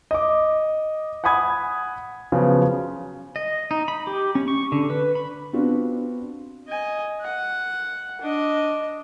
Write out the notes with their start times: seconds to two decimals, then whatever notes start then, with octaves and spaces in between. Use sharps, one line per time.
0.11 D#5 D6
1.24 F#5 G#5 B5 D#6 G#6
2.32 C#3 F3 F#3 B3
3.36 D#5
3.71 D#4
3.88 B5
4.07 G4
4.35 C#4
4.48 C#6
4.72 D3
4.90 B4
5.15 B5
5.53 B3 C4 D4 F4 F#4
6.68 D#5 G#5
7.21 F#5
8.21 D4 D#5